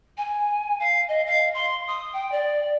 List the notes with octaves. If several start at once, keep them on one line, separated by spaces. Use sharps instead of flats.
G#5
F5
D#5
F5
C6
D#6
G5
D5